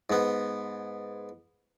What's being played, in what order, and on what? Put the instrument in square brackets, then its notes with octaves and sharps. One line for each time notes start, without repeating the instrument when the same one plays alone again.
[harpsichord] G#2 B3